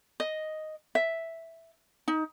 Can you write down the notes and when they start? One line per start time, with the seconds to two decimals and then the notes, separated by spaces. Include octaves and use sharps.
0.20 D#5
0.95 E5
2.08 D#4